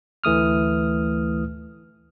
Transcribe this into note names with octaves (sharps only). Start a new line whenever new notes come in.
D2 E3 A3 D#6 F6